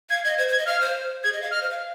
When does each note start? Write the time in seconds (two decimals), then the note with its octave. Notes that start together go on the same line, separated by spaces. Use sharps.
0.10 F5 G#6
0.23 D#5 G#6
0.38 C5 G#6
0.48 C5
0.52 G#6
0.58 D#5
0.66 F5 F6
0.81 C5
1.24 G#4 G#6
1.33 D#5
1.42 F5
1.51 D#5 F6
1.61 C5
1.70 F5